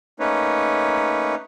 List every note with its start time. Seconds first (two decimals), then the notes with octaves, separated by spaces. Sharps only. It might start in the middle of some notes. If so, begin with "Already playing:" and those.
0.20 A3 A#3 C#4 D#4 B4 C#5